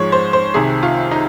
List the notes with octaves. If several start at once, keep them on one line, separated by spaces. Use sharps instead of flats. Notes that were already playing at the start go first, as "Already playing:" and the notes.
Already playing: G#2 F3 G#3 C#5
C5
C5
C2 C3 D#3 G#4
F4
D#4